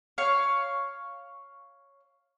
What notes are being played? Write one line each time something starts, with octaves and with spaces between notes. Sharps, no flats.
C#5 F5